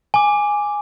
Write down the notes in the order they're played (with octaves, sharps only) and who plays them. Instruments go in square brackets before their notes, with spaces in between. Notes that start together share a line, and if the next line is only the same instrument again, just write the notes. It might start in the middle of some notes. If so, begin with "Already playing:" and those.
[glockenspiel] G#5 D6